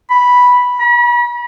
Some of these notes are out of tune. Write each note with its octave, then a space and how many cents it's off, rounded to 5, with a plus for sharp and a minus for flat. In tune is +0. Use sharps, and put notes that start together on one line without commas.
B5 -5
B5 -40